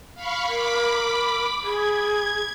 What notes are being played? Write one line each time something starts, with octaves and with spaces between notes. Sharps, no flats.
F5 B5 C#6
A#4 B5 D6 B6
G#4 G#6